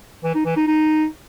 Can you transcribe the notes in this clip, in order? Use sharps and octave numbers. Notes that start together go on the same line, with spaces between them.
E3
D#4
E3
D#4
D#4